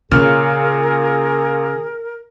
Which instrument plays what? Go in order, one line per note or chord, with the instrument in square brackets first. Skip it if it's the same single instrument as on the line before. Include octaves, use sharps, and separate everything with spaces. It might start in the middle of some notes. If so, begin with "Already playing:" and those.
[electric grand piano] A#2 F6 [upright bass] C#3 [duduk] G#4 [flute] A#4